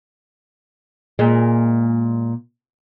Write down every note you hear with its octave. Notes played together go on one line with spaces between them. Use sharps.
A#2 G#3